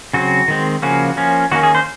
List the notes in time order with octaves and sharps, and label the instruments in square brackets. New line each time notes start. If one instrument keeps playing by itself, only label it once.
[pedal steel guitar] C#3 F#3 C4 F#4
D#3 G#3 C4
C#3 F3 A#3 C#4 F#4
F3 A#3 C#4
D#3 A#3 C#4 F#4
G#4
C5